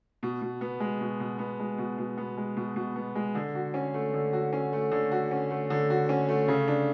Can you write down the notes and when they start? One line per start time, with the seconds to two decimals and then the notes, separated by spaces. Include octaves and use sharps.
0.23 B2
0.42 B2
0.61 B3
0.80 G#3
1.01 B2
1.20 B2
1.39 B3
1.60 G#3
1.78 B2
1.98 B2
2.18 B3
2.37 G#3
2.57 B2
2.76 B2
2.96 B3
3.15 G#3
3.35 D3
3.55 F#4
3.74 C#4
3.94 A3
4.14 D3
4.33 F#4
4.53 C#4
4.73 A3
4.92 D3
5.12 F#4
5.31 C#4
5.51 A3
5.70 D3
5.90 F#4
6.09 C#4
6.28 A3
6.48 C#3
6.68 D4